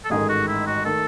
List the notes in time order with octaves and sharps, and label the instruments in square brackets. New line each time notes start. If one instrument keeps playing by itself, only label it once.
[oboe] A4
[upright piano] A1 G#2 D#3 A3 [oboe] G#4
[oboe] F#4
E4
F#4
[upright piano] D#3 A3 [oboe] A4